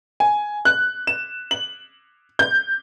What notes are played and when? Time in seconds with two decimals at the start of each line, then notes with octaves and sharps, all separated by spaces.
0.20 G#5
0.65 F#6
1.07 E7
1.51 F#7
2.39 G6